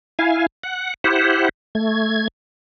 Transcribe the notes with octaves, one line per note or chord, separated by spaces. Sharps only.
E4 F5 G#5
F#5
E4 G4 C5 F#5
A3 G#6